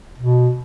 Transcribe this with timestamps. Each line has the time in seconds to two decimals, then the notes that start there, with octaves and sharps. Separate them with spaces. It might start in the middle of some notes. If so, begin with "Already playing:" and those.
0.18 B2